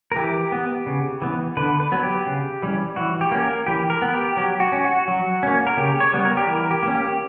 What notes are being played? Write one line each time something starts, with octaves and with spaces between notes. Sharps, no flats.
A#4
E3 G4
B3
C#3
E3 B3
D3 B4
B4
F#3 B3
G4
C#3
E3 G3 C#4
E3 F#4
G4
A#3 C#4
A#4
E3 G4
A#4
B3
G4
F#3 G4
F#4
C#4
F#4
F#3
A#3 C#4
A#4
C#3 G4
C#5
G3 B3
A#4
G4
E3 A#4
G4
A#3
C#4
G4